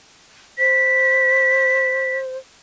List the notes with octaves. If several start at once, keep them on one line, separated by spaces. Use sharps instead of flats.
C5 B6